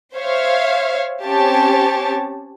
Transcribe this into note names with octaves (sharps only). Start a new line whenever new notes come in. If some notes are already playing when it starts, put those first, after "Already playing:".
C5 C#5 E5 F5
C4 C#4 G4 C#5 A5